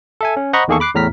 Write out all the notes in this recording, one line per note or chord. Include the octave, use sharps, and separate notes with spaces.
A4 E5 G#5
C#4
C5 D#5 F#5 A#5 B5 C#6
E2 D#3 A#3 G#4 A4 C#6
B5 D6 F#6 C7
E2 A2 A#5 F6 B6